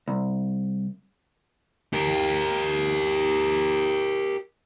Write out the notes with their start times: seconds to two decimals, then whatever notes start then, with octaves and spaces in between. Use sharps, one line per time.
0.08 C2
1.93 G4 A#4